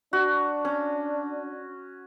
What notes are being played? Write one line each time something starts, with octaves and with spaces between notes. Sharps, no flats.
D4 F#4
C#4